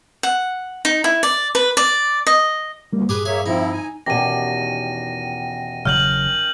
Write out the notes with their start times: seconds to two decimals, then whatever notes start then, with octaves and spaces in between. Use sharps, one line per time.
0.23 F#5
0.85 D#4
1.04 E4
1.23 D5
1.55 B4
1.77 D5
2.27 D#5
2.93 D2 G3 A#3
3.09 G2 G4 G#4 B4 D#6
3.25 A#3 G#4 C#5 E5
3.46 F3 C4 D#4 E4
3.73 G#5
4.06 E2 B2 D#3 C#4 G4 A#6 D#7
5.85 E1 C#3 F#3 F6 G6 F#7